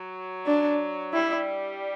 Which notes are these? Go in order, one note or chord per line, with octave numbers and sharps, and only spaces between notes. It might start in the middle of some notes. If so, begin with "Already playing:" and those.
Already playing: F#3
D4
G3 E4